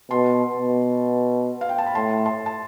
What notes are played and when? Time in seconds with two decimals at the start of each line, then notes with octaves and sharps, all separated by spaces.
0.11 B2 A5 C6
0.57 B2
1.61 F5
1.69 G5
1.78 A5
1.86 B5
1.95 A2 A5 C6
2.26 A5 C6
2.46 A5